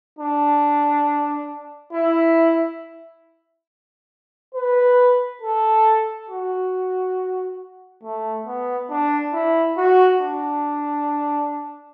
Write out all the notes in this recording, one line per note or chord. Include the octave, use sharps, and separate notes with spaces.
D4
E4
B4
A4
F#4
A3
B3
D4
E4
F#4
D4